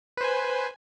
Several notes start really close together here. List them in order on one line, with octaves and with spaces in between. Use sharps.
B4 C5 G#5